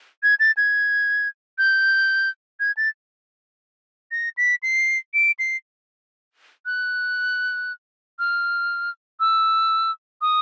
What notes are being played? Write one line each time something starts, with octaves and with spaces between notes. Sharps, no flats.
G#6
A6
G#6
G6
G#6
A6
A#6
B6
C7
D7
C7
F#6
F6
E6
D#6